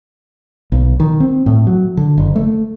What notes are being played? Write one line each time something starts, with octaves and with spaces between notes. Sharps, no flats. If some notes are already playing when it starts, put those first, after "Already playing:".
B1
D#3
C4
A2
F#3
D3
F#1
A3